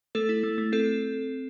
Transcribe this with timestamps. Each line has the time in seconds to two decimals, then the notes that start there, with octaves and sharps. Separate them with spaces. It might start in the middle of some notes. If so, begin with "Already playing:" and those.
0.15 A3 A4
0.29 E4
0.43 A3
0.58 A3
0.72 C4 A4